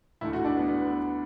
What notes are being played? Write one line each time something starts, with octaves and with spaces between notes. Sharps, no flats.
D2 D3 A3 E4
F#4
D4
B3
B3